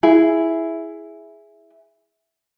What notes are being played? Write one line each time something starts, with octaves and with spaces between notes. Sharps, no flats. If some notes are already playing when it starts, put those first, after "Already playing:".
E4 G#4